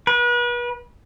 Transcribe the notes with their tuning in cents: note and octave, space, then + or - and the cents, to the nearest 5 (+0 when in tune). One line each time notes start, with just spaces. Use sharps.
B4 -35